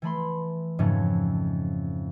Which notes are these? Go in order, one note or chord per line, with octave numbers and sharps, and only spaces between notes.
E3 A3 B5 C6
F2 G#2 C#3 F3 A3 C#4